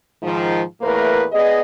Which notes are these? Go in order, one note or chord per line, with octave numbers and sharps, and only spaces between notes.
G#2 D#3 F3
E2 A2 A3 A#3 A#4 B4
B3 G#4 D5 D#5